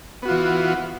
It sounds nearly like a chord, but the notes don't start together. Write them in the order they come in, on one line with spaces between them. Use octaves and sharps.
B3 F#4 F4 E3